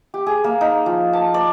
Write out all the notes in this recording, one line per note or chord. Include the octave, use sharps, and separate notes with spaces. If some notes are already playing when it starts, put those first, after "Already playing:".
G4
G#4
A#3
D#4
F3
A5
D5